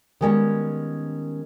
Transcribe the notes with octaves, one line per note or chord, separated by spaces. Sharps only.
D#3 G3 G#3 A#3 B3 C#4